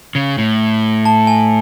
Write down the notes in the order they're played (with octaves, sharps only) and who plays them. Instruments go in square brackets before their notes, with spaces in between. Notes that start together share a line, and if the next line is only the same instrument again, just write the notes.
[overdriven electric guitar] C#3
A2
[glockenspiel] A5
G#5